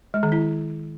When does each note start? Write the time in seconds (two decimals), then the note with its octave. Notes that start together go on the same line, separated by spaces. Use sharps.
0.14 G#3
0.23 D#3
0.32 E4